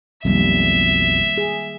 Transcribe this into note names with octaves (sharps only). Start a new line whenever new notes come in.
B1 F2 D#3 G3 A#3 E5
G#4